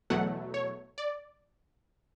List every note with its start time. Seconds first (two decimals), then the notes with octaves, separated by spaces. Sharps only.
0.10 E2 B2 F#3 A3 F#5
0.54 C#5
0.98 D5